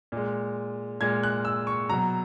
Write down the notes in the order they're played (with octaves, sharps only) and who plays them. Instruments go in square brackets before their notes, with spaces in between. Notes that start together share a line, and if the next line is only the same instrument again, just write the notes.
[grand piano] A#2 G#3
A#2 G#3 G#6
F#6
E6
C#6
B2 F#3 A#5